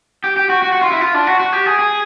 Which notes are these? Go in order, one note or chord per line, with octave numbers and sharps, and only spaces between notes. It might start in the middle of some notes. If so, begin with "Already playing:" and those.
G4
G4
F#4
F#4
F#4
F4
E4
F4
D4
F#4
F#4
G4
G#4
G#4